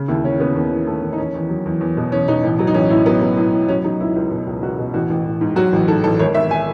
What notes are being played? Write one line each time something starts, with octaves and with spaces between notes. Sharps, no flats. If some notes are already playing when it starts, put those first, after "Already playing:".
Already playing: C#3
D#2 E4
C#3 C#4
C#3 B3
D#2
E3
D#2 A3
D#2
D#4
E2 C#4
E2
F#3
E2
E2
B2
E2 C#4
B2 D#4
A1
F#3
D#4
A1 C#4
A2 E4
F#3 B3
F#3
A2
A2
F#3 C#4
F#3 D#4
C#2 E4
C#2
B2
C#2
C#2 F#4
B2
A1 F#4
A1
A1
G#2
F#3 F#4
A1
G#2 A4
A1 A4
G#1 C#5
G#1 E5
G#5